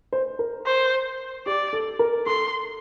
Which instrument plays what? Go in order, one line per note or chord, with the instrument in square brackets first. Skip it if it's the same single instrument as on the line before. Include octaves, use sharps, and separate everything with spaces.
[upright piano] C5
A#4
[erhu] C5
[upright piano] G4 [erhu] D5
[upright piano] A4
A#4
[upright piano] A4 [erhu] C6